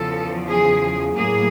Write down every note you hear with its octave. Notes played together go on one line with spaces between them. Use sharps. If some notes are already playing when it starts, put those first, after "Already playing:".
Already playing: E2 C#3 F3 A4
G#4
A2 F#3 A#3 G#4